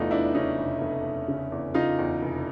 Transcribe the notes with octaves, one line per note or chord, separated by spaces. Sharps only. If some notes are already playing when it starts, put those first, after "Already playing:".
Already playing: F1 E2 A3 B3 D#4 F4
E2 D4 E4
C#3 C#4 D#4
F1
F1
F1
C#3
E2
C#3 D#4 F4
E2
F1